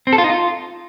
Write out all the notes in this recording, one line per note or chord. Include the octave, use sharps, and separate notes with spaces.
C4
A4
F4
D#4
F4